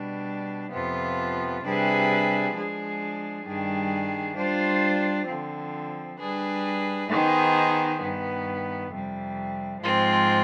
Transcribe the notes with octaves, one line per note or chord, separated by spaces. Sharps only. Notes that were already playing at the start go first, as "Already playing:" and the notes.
Already playing: B2 G3 D4
F2 C3 F3 B3 F4
C3 G3 D4 G#4 B4
F3 G#3 D4 G#4
G2 D#3 G3 D4 G#4
G3 D4 F4 C5
D3 F3 C4
G3 D4 G#4 B4
D#3 B3 D#4 G#4 C5
G2 D#3 B3
F2 C3 G3
G#2 F3 G#3 C4 F4